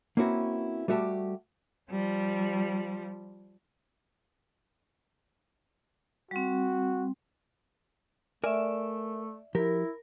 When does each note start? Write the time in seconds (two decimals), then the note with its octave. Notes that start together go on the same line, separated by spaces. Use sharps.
0.17 A#3 C4 C#4 E4 F#4 B4
0.88 G3 A3 F#4 G4 A4
1.90 F3 G3
6.31 G3 C4 F#4
8.44 A3 A#4 D5 E5 G#5
9.55 F3 E4 G4 A#4